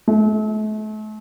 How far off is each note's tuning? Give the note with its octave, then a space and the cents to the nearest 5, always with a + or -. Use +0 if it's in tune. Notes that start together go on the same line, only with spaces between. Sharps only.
A3 -40